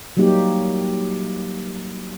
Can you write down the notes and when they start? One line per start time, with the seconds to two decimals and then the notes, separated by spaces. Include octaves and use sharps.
0.17 F#3 G3 A#3 D#4 G4